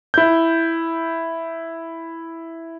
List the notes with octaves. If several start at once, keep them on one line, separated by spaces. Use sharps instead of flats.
E4 G6